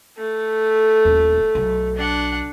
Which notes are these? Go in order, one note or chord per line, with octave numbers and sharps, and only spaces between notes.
A3
D#1 A#1
B1
D4 F#5